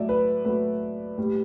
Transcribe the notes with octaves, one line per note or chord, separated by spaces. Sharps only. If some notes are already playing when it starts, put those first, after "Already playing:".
Already playing: A2 F#3 A3 D5 E5
B4
A2 F#3 A3 B4
A2 G3